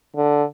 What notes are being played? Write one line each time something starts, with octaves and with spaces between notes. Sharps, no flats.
D3